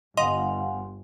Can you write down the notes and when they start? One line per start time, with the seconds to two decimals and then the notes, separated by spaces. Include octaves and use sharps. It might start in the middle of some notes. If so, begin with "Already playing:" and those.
0.17 G1 D#5 F5 F#5 G#5 C6